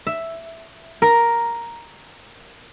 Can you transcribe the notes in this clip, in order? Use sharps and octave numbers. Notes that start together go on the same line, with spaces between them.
E5
A#4